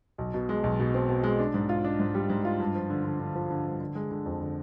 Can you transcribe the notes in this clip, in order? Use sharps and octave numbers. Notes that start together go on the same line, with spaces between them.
B1
B2
G#3
B1
B2
C4
B2
G#3
D4
G#2
F4
D4
G#2
G3
G#2
F4
G2
F3
D3
D3
D3
F3
D3
G2
D3
G#3
D3
F2
D3